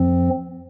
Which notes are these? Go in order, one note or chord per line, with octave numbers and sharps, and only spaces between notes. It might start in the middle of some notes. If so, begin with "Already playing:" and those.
Already playing: F2 F3 C4